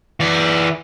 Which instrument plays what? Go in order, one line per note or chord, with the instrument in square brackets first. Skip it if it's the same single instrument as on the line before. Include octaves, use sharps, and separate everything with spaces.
[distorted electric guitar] E3 D5